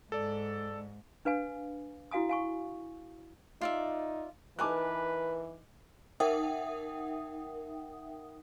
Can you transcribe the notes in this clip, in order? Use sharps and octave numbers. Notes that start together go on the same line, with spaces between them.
G#2 A4 D5
D4 B4 F5 G#5
E4 F#4 F5 G#5 D#6
F5 G#5 C#6
D#4 F4 D5 E5
E3 D#4 A#4 B4 G#5 A5 D6 F#6
D#4 A#4 E5 F#5 G5 D#6